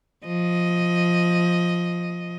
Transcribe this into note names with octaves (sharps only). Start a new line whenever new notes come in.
F3 D#5